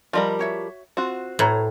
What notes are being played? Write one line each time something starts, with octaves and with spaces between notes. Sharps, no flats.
F3 G3 A#4 D5 D#5 B5
F#4 C#5 E5
C4 F4 F#4
A2 B4 C#5 A#5